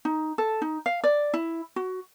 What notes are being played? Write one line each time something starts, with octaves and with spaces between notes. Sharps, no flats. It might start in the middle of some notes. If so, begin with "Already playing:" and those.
D#4
A4
D#4
F5
D5
E4
F#4